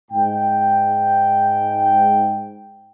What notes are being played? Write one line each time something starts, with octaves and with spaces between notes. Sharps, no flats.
G#2 G5